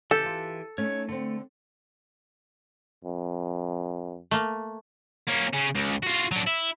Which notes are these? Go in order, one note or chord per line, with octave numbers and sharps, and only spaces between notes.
C#3 E3 G4 A4 G6
F4
A3 C#4 D#4 C#5
D3 A3 C4
F2
A3 A#3
A#3 C#4
C#3 C#4
C#2
F4 F#4
F#3 D4
E4